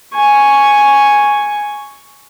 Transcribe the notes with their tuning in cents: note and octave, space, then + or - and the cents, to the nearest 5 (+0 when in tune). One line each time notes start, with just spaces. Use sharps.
G#5 +0 C#6 +0